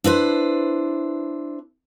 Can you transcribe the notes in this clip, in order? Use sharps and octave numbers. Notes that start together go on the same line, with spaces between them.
D4 E4 B4 C5